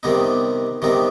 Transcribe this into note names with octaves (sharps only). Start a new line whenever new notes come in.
C3 D#3 G3 B3 D#4
C3 D#3 G3 B3 D#4